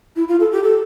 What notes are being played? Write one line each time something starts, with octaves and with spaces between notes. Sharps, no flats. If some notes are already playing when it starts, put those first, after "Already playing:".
E4
F4
A4
G4
A4